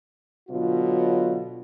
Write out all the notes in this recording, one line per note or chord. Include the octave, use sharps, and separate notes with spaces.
B2 D3 F#3 F4